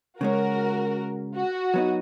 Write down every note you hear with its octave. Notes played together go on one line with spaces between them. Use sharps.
C#3 G#3 C#4 F#4 A#4
F#4
F#3 B3 D#4